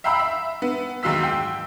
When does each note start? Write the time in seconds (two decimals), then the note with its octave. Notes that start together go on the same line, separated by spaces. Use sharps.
0.04 E5 F5 G5 A#5 B5 E6
0.19 E5
0.62 B3
1.03 D#2 G#2 F#3 F5 E6 B6
1.23 G5